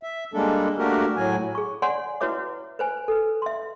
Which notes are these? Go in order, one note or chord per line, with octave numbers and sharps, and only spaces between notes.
E5
G3 G#3 A#3 D4 A4
A3 A#3 D4 F#4 G4 A#4
A2 F#3 G#5
G#4 C#6
C#5 D5 F#5 G#5 C6
E4 F#4 B4 C#5 E5 D6
B4 C5 G#5
A4 B4
E5 C6